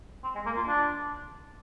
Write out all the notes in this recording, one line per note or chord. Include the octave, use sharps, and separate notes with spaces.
C4
G#3
A#3
F4
D4